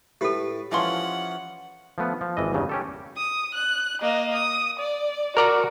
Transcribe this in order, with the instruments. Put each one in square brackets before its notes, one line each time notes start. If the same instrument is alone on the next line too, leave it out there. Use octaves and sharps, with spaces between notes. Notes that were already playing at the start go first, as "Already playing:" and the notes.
[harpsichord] A2 B4 [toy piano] G4 A4
[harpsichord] E3 F3 C#4 [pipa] G#3 A3 C6 [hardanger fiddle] F#5
[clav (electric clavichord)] F3 A3 B3
F3
G#1 E3 D#5
E2 G2 C#3
C#4 G4 A4
[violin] D#6
F#6
A#3 D#5
D#6
D5
[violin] F#4 [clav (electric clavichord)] A#4 D5 A#5